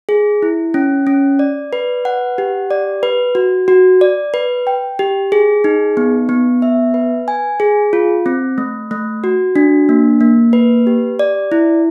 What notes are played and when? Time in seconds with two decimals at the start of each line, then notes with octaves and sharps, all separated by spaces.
0.09 G#4
0.42 E4
0.74 C#4
1.07 C#4
1.39 D5
1.73 B4
2.05 F#5
2.38 G4
2.71 D5
3.03 B4
3.35 F#4
3.68 F#4
4.01 D5
4.34 B4
4.67 G5
4.99 G4
5.32 G#4
5.64 D#4
5.97 B3
6.29 B3
6.62 E5
6.94 B4
7.28 G#5
7.60 G#4
7.93 F4
8.26 C4
8.58 A3
8.91 A3
9.24 F#4
9.56 D4
9.89 A#3
10.21 A#3
10.53 B4
10.87 G4
11.19 D5
11.52 E4